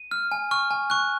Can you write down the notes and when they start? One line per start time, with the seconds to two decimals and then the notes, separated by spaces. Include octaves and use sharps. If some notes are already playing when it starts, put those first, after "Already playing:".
Already playing: D#7
0.11 F6
0.32 G#5
0.51 C#6 F6
0.71 G#5
0.90 C#6 F#6